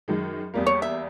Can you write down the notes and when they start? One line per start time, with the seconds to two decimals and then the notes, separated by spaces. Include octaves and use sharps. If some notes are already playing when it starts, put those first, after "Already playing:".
0.08 F#2 D#3 G#3
0.54 E2 G3 A#3
0.66 C#5
0.82 E5